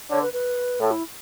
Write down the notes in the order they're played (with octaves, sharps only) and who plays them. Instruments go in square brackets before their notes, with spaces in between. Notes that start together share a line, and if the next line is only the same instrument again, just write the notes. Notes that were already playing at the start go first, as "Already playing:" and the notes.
[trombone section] D3 [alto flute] C#5
[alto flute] B4
B4
[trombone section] A2 [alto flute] A4
[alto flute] E4